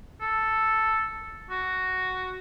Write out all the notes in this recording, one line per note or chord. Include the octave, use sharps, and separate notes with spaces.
A4
F#4